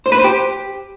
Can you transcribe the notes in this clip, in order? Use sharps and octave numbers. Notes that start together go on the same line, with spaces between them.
C5
B4
C5
G4